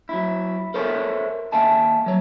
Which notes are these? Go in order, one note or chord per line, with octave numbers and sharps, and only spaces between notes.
F#3 E4
A4 A#4 C5 C#5 E5 G#5
D#2 E5 F5 G#5 A5
F#3 C#5